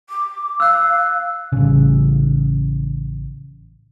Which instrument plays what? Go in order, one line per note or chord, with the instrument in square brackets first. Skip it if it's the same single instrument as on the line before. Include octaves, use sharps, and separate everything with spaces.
[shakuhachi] D6
[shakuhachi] F5 [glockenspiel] E6 F#6
[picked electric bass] A1 C#3